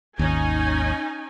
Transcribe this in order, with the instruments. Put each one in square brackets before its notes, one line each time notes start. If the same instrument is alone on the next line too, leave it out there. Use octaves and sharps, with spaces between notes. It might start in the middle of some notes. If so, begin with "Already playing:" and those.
[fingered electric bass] G#1 D#2 [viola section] C#4 D#4 G#5